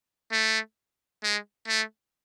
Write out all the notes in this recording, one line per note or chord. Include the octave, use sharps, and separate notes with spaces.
A3
G#3
A3